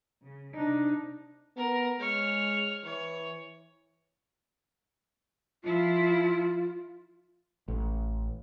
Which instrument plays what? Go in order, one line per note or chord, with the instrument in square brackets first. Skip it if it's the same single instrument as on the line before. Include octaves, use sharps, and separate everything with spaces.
[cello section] C#3
[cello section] C3 D#4 [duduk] D4
[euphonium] B3 [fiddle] A#4
[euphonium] G#3 [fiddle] C#5 F6
[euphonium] E3 [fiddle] C#5
[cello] F3 E4 [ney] F4
[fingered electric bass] A1